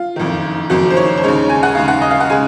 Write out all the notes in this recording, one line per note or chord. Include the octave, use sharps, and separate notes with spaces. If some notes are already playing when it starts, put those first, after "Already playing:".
Already playing: F4
F#1 F2 D#3
F#1 F2 D#3 F#4
C5
C#5
C5
D#2 C#3 G#3 C#5
G#5
F#5
D#2 C#3 G#3 F5
F#5
D#5
F5
F#5
C#3 G#3 G#5